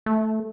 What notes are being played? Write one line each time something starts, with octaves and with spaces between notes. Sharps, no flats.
A3